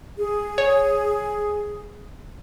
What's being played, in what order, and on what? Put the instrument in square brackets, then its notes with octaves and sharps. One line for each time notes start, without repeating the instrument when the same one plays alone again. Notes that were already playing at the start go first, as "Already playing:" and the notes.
[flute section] G#4
[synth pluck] C#5